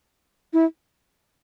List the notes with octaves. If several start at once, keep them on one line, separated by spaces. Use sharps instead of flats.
E4